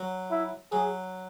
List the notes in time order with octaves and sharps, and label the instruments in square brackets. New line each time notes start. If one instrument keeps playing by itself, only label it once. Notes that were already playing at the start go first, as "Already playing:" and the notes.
Already playing: [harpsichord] F#3
[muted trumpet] E4
[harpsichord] F#3 [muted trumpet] G#4